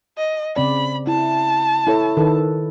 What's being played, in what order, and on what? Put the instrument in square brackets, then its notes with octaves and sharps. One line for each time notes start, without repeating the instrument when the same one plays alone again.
[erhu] D#5
[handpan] C#3 C4 D5 [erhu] B5
[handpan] E4 [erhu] A5
[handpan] E4 A4 C#5
D#3 A4 B4